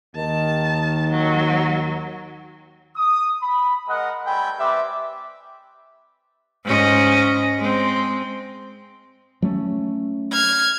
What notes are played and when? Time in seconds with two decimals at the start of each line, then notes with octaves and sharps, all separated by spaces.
0.16 D#2 D#3 A5
1.10 F#3
2.96 D#6
3.42 B5
3.88 G#3 A#4 D#5 F#5
4.26 G3 A3 C4 G5 G#5 B5
4.58 G3 C4 G4 B4 E5 D6
6.65 G#2 C#4 D#5
7.59 G#3 C4
9.42 F#3 A3 C#4
10.32 F6 G#6